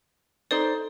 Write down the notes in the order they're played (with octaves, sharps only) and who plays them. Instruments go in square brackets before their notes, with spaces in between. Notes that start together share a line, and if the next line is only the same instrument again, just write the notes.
[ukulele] D#4 C5 D5 [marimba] A4